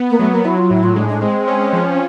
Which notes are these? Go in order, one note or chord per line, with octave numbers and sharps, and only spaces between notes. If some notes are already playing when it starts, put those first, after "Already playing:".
Already playing: B3
A#3
F#3 A3
A#3
F#3 E4
F4
A2 E4
F4
G#3 D4
D4
G#3 C4
C#4
F3